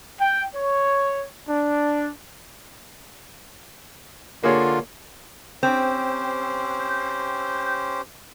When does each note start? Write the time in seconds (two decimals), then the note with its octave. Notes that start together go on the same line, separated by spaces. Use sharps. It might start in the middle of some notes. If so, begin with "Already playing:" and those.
0.20 G5
0.54 C#5
1.48 D4
4.44 D3 A#3 F4 G#4 C#5
5.63 C4 C#4 G4 C5